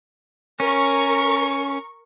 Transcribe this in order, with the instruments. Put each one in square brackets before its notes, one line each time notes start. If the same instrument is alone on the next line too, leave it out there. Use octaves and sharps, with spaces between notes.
[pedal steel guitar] C#4 [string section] A#4 C#6